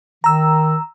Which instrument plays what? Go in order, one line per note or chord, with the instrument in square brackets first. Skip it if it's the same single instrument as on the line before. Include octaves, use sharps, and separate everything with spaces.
[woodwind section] D#3 [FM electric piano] A#5 E6